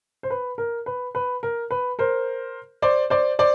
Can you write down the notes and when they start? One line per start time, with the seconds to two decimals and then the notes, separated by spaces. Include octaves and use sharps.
0.23 C5
0.30 B4
0.58 A#4
0.86 B4
1.15 B4
1.43 A#4
1.71 B4
1.99 A#4 C5
2.82 C5 D5
3.10 C5 D5
3.39 C5 D5